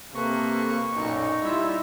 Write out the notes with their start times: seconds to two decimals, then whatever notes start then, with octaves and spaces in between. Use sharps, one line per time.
0.14 C3 A#3 A4 B4 C#6
0.94 B1 F#2 A#2 D#4
1.43 G3 E4 F4 E5